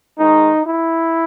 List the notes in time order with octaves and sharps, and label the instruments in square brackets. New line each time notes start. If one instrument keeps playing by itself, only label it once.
[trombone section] G#2 D#3 G#3 D#4
E4